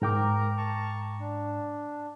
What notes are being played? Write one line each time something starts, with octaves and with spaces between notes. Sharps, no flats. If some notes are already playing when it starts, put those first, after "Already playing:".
G#2 A#4 G5 A#5 D6
A5 A#5 C#6
D4